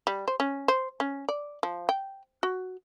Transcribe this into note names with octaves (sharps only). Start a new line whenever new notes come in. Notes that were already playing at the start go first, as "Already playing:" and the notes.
G3
C5
C#4
C5
C#4
D5
F3
G5
F#4